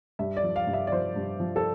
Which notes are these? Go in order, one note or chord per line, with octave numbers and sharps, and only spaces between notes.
G2 E5
D5
F3
F5
G2
E5
D5
F3 C5
G2
F3
A4